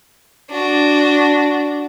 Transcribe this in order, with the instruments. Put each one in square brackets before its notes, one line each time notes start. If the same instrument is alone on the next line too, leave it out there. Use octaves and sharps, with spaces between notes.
[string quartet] D4 F#4